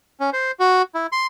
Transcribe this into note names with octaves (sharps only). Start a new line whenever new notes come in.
C#4
C5
F#4
E4
C6